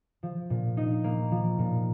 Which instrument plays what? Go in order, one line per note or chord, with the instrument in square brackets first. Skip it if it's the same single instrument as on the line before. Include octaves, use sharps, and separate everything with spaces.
[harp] F3
A#2
D#4
A#3
F3
A#2